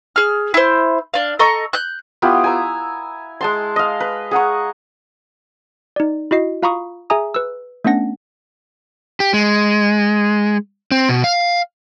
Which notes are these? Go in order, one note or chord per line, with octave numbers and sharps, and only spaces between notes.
G#4 F6
E4 C5
D4 F5
A4 D#5 A#5 C#6
F#6 G6
B3 E4 F4 G4
G#5 A#5 E6
G#3 A5 C6
D#5 F5
B4
G#4 F#5 A#5 C#6
D#4 D5
E4 F#4 D#5 C7
F4 F5 A#5 B5 C#6 D#6
G#4 E5 G#5 A#5 D#6
B4 E6
A3 B3 C#4 D4 F#5 A#6
G4
G#3
C4
B2
F5